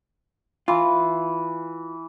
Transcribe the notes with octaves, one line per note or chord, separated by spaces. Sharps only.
E3 F4